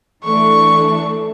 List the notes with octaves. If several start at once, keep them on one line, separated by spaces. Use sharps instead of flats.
E3 A3 D4 C#6